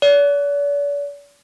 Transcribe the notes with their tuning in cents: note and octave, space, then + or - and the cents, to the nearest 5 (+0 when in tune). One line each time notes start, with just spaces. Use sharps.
D5 -45